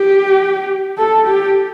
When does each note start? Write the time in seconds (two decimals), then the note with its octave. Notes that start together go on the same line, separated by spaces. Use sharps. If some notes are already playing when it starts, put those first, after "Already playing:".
Already playing: G4
0.98 A4
1.26 G4